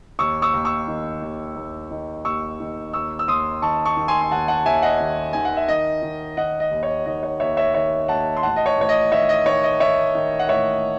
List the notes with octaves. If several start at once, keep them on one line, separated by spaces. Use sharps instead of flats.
D#2 C#6 E6
C#6 E6
D#2
C#6 E6
D#3
D#2
D#2
D#3
D#2 C#6 E6
D#3
D#2 C#6 E6
E6
D#2 C6 D#6
D#3 A5 C#6
A5 C#6
D#3
G#5 C6
C6
D#2 F#5 A5
F#5 A5
D#2 E5 G#5
D#5 F#5
D#3
D#3 G#5
F#5
E5
D#3 D#5
D#3
D#3 D#5 F#5
D#5
D#2
C#5
D#3 D#5
C#5
D#2 C#5 E5
C#5 E5
D#3 C#5
D#2 F#5 A5
C6
A1 F#5 A5
D#5
C#5
A1 C#5
D#5
D#3 C#5 E5
D#5
D#3 C#5
D#5
D#3 C#5 E5
D#3
F#5
A1 C#5 E5